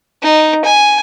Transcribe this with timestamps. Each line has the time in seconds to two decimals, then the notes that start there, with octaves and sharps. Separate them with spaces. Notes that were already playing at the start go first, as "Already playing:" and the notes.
0.23 D#4
0.65 G#5